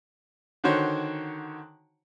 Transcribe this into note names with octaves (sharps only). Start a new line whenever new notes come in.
D3 D#3 F#4 C5 C#5